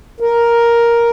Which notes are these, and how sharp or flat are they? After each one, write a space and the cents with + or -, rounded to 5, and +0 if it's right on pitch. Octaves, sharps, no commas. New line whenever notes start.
A#4 +5